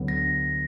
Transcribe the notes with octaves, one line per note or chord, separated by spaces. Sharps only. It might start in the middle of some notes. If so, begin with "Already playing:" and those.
Already playing: D2 D3 F#3 B3
A#6